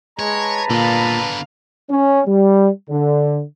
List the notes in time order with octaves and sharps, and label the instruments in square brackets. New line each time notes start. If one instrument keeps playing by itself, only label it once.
[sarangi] G#3 [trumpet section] B4 A5 A#5 [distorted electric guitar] C#5
[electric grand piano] A#2 [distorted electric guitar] D3 B3 [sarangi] F5
[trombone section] C#4
G3
D3